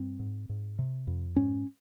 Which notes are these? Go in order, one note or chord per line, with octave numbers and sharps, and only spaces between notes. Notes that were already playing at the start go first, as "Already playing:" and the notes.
Already playing: G2 C4
G#2
G#2
C3
F2
G#2 C#4